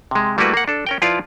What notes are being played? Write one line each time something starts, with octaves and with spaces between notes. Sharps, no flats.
C3 G#3
G3 A3 A#3 E4 F#4 B4
A#3 F#5
D4 A4
C#4 A#4 G5
F3 E4 F4 B4 D5 F5